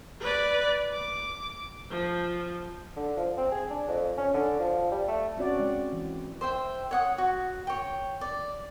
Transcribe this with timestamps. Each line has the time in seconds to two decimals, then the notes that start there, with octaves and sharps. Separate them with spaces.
0.20 B4 D5
0.93 D6
1.90 F3
2.97 D3
3.17 F3
3.37 C4
3.52 G#4
3.70 D4
3.88 F2
4.17 C#4
4.34 D3
4.59 F3
4.91 G3
5.08 A3
5.37 C4 C#4 F#4 D5
5.59 G#3
5.93 E3
6.41 C5 E5 G5
6.91 C#5 F#5 D#6
7.18 F#4
7.67 C#5 G5
8.21 D5